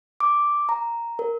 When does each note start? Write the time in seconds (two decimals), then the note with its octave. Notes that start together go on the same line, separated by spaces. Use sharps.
0.20 D6
0.69 A#5
1.19 A#4